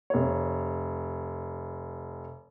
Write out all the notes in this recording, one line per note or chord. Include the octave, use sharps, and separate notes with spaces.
F1 C#5